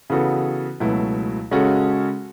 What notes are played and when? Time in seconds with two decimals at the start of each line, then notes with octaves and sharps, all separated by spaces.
0.10 C#3 E3 B3 F#4 A4
0.80 C#2 B2 F#3 A3 E4
1.51 C#3 G#3 C#4 F#4 A4